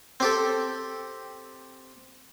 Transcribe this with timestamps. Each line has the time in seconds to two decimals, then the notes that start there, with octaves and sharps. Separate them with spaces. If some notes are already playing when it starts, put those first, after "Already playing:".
0.20 C4 G4 A4